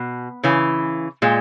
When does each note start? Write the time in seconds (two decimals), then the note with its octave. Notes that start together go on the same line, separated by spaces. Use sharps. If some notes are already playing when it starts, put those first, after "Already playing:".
Already playing: B2
0.43 C#3 E3
1.22 A#2 G#3